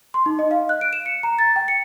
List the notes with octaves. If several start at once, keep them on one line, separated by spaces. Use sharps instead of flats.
C6
D#4
D#5
F5
F#6
D7
E7
C#7
A#5
A6
G5
C#7